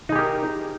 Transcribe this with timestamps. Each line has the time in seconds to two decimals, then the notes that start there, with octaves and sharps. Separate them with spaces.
0.09 D#4
0.12 G#4
0.16 G4
0.19 A#4